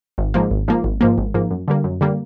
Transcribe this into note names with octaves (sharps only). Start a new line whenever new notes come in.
G#1
G#2 F3 A#3
G#1
G#2 F3 A#3
G#1
G#2 F3 A#3
G#1
G#2 F3 A#3
F#2
D3 G3 A#3
F#2
D3 G3 A#3